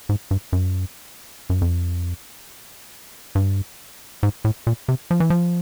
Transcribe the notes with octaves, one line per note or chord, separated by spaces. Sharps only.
G#2
G2
F#2
F#2
F2
G2
G#2
A2
A#2
C3
F3
E3
F3